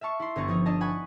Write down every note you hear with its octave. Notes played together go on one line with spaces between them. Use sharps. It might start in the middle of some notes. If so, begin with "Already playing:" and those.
E5 F5 A5 C#6
E4 C6
G1 B3 C#4 A#5 C#6 A6
F3 D#4 C#5
D4 D#5 A5 A#5
F#5 G#5 B5 C#6